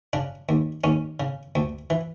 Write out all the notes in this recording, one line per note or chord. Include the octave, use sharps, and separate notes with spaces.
C#3 D4
D#2
D#2 C#4
C#3
D2
E3